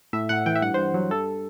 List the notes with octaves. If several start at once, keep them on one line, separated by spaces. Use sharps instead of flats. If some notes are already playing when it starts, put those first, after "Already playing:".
A2 E5
A2 F#5
E3 G5
E5
G2 F#5
G2 C5
F#3
G2 A4